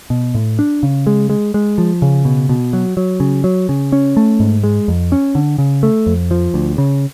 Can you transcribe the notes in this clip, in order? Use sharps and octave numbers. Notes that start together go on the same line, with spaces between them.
B2
A2
D4
C#3
G#3
G#3
G#3
F3
C#3
B2
B2
F#3
F#3
C#3
F#3
C#3
C#4
A3
G#2
G#3
F2
C#4
D3
C#3
A3
F2
F3
D2
C#3